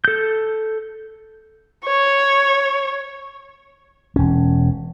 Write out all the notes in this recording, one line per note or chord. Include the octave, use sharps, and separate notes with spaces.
A4 G6
C#5
E1 C#4